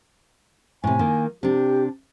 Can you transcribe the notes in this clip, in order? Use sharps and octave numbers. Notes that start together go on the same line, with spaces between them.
A2 C3 G#5
D#3 A#3
C3 D4 G4